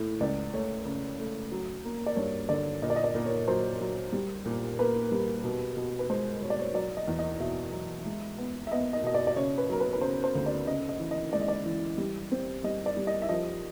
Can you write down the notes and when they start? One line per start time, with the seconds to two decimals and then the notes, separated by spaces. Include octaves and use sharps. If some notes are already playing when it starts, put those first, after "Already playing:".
Already playing: A2
0.20 C#2 D5
0.54 A3 C#5
0.85 C#3
1.19 A3
1.52 F#3
1.85 A#3
2.06 D5
2.16 G2 C#5
2.49 D3 D5
2.82 A#2 D#5
2.90 D5
2.96 D#5
3.04 D5
3.15 A#2
3.26 C#5
3.48 F#3 C5
3.81 F#3
4.13 G3
4.46 A#2
4.79 A#3 B4
5.12 G3
5.44 B2
5.77 B2
5.99 B4
6.10 G#3 C5
6.42 B2 C#5
6.50 D5
6.59 C#5
6.74 F#3 D5
6.97 D#5
7.08 E2
7.19 D#5
7.40 B2 E5
7.72 F#3
8.05 G#3
8.38 B3
8.67 E5
8.72 B3 D#5
8.93 D#5
9.04 B2 D#5
9.14 D5
9.27 D5
9.36 C#3 C#5
9.58 B4
9.69 F#3 A#4
9.80 B4
9.93 B4
10.01 C#3 C5
10.24 C5
10.35 D2
10.46 D5
10.67 C#3 D#5
10.89 D#5
11.00 E3
11.11 D#5
11.33 G#3 D5
11.41 D#5
11.48 D5
11.66 E3
11.98 G3
12.32 C4
12.64 G3 D#5
12.86 D5
12.97 G3
13.07 D#5
13.22 E5
13.29 F3 D#5